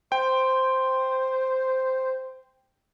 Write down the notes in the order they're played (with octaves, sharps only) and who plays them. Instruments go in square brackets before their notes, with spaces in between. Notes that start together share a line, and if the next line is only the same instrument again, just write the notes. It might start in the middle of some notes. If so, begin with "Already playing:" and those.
[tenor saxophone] C5 [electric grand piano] G5